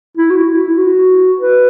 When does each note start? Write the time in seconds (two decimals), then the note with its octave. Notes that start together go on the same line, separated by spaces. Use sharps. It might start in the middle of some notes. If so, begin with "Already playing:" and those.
0.17 E4
0.30 F#4
0.44 E4
0.69 E4
0.78 F#4
1.39 B4